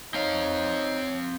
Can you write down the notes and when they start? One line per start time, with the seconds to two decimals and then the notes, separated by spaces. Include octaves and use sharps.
0.14 C4 D#4 C#5 F5